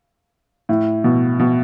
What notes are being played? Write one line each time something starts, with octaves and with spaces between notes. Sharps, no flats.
A2
B2
B2